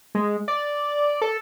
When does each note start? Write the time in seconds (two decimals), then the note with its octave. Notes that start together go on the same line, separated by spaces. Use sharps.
0.15 G#3
0.48 D5
1.22 A4